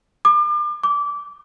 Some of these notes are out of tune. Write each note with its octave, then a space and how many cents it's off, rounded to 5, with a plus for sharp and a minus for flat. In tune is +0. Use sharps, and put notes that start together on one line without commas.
D6 +35
D6 -20